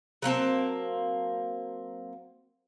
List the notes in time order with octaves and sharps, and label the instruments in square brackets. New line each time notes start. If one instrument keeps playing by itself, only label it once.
[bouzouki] F#3 A#3 C4 A5